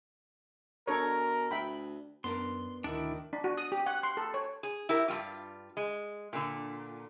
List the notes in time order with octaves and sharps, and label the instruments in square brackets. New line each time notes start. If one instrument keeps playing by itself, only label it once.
[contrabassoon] B2 [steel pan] D4 A4 C#5 [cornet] A#4
[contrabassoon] D2 [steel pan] E5 G5 B5
[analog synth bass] F#2 [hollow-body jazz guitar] B3 D4 A#4 [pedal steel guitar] C6
[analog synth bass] D2 [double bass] D#3 [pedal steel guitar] D4 E4
[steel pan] D4
F#4
D#6
G4
F#5
C6
A4
C#5
[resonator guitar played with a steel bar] G#4
E4 G4 A#4
G2 A#2 G3 F4
G#3
A#2 D3